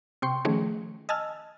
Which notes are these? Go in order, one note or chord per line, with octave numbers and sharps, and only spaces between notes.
C3 G5 C6 C#6
D#3 F3 A3 C#4 G#4
D#5 G#5 A5 E6 F6